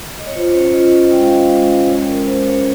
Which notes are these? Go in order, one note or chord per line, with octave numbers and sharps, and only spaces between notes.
D#5
C#5
F4 C5
C5
C#4 C#5
F4 D#5
C#4 D#5
G#3 G5
F5
G#3 D#5
G#3 F5
C#4
G#3 C#5
G#3 A#4
G#3 C5
C#4 C#5